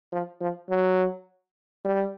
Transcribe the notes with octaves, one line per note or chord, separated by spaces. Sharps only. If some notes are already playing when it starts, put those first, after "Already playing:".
F3
F3
F#3
G3